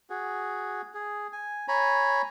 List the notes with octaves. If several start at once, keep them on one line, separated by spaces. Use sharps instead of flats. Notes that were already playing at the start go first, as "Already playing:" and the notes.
F#4 G#4
G#4
G#5
C#5 G#5 A#5 B5